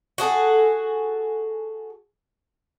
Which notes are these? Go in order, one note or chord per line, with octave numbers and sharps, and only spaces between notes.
F#4 G#4 A4